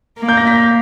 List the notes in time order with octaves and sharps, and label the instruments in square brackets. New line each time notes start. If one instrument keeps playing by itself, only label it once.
[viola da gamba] A#3
[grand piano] G6
A#6
B6